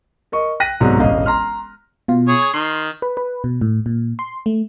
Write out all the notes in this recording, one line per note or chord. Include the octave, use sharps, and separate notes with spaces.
A#4 D#5 C#6
G5 F#6 A#6 B6 D#7
C2 G#2 B2 F#3
E1 A1 D#5 F5
A#5 C6 F6
B2 F4
G#4 C#5
G#6
D#3 C6
B4
B4
B2
A2
A#2
C6
A3